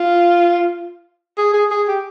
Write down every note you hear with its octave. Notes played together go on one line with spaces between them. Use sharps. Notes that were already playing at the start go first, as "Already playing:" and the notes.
Already playing: F4
G#4
G#4
G#4
G4